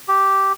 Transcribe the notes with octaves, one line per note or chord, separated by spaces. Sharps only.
G4